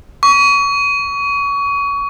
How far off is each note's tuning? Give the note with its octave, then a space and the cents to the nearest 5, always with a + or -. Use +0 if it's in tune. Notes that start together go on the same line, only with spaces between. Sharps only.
C#6 +30